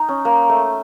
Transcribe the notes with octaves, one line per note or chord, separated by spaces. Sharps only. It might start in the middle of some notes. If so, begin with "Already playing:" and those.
Already playing: D#4
C#4
A#3
A3